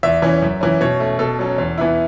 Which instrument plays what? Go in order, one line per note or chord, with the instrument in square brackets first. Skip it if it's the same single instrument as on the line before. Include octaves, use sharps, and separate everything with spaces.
[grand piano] E2 E5
E3 C#4
F#2
E3 C#4
B2 C#5
A3 C#4
B2 A4
F#3 C#4
E2
E3 B3 E4